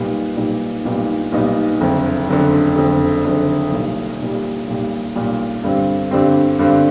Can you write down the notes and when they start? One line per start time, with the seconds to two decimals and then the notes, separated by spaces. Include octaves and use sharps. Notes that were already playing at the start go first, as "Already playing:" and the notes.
Already playing: B1 A#2 G3 B3 D#4
0.37 B1 A#2 G3 B3 D#4
0.84 B1 A#2 G3 B3 D#4
1.32 B1 A#2 G3 B3 D#4
1.81 F#1 F2 D3
2.28 F#1 F2 D3
2.76 F#1 F2 D3
3.24 F#1 F2 D3
3.72 B1 A#2 G3
4.19 B1 A#2 G3
4.67 B1 A#2 G3
5.15 B1 A#2 G3
5.64 G2 D3 G3 C4
6.11 G2 D3 G3 C4
6.59 G2 D3 G3 C4